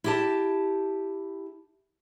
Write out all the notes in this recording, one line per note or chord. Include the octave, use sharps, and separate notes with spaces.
E4 G4 A5